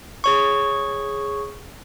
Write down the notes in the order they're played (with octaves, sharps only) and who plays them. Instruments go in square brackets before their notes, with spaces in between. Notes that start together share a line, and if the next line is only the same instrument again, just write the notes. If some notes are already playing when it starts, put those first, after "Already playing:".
[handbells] G#4 C#5 C#6